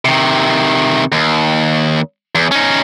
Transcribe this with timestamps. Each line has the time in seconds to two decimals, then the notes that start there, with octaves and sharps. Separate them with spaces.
0.05 C3 D#3
1.12 D#2
2.35 E2
2.51 C#4 D#4